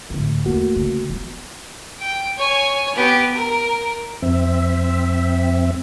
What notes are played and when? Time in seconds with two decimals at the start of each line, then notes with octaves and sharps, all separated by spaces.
0.10 D2 A2
0.45 E2 A3 A#3 F#4
0.76 C#3
1.10 F#3 B3
1.99 G5
2.37 C#5 G#5
2.96 B3 G4
3.34 A#4
4.22 F2 C4 E5